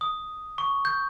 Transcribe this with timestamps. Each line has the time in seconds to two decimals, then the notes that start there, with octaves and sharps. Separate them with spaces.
0.01 D#6
0.58 C#6
0.85 G6